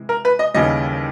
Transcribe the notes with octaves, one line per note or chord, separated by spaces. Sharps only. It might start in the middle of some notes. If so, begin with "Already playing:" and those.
Already playing: C3 E3 G#3
A#4
B4
D#5
D#2 C#3 E3 G3 D#5